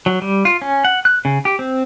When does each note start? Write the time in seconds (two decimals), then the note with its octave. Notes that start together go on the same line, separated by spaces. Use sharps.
0.06 F#3
0.22 G3
0.45 F4
0.62 C#4
0.85 F#5
1.05 F#6
1.25 C#3
1.45 G4
1.59 C4